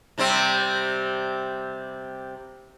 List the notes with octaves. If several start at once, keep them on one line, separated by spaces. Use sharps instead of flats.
C3 G3 C4